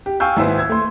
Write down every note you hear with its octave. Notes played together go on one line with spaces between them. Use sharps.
G4
F5 G5 G#5 C#6 E6 G6
G#1 E4 B4 C5 E6
E6 G#6
A3 C6